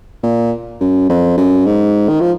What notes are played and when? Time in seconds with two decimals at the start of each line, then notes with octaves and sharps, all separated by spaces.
0.23 A#2
0.81 F#2
1.09 F2
1.38 F#2
1.66 G#2
2.09 D#3
2.21 F3